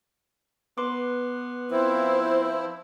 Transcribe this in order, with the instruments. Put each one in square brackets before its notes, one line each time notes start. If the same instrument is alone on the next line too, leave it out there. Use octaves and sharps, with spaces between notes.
[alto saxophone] B3 [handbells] B4 C6 D6
[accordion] F3 C4 E4 [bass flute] C5